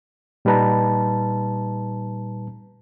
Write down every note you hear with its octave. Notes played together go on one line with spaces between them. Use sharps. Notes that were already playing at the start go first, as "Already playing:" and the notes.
A#2 G3 D#4 B4 A5 A#5